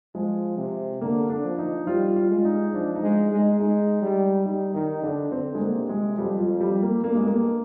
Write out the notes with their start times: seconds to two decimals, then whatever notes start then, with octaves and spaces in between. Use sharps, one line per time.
0.15 F3 G#3
0.58 C3
1.01 D3 A#3
1.29 D4
1.44 F3
1.58 D#4
1.87 G3 F4
2.16 F4
2.30 G#3
2.45 D#4
2.74 F3 D4
2.95 D#4
3.02 G#3
3.31 G#3
3.38 D#4
3.60 G#3 D#4
4.02 G3
4.46 G3 D#4
4.74 D#3 D#4
5.03 D3 D4
5.32 D3 C4
5.55 G#3
5.60 A#3
5.75 C3
5.89 G#3
6.17 F2 G3
6.39 F3
6.60 G3
6.82 A#3
7.04 G2 A#3
7.15 G#3
7.27 A#3